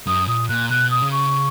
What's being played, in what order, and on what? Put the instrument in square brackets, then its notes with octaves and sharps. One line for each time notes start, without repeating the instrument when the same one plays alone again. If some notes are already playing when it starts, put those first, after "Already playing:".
[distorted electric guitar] F#2 [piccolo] D#6
[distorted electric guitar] A#2 [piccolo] D#6
[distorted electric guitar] A#2 [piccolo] F#6
[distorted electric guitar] B2 [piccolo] F#6
[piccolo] D#6
[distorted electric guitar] C#3
[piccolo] C#6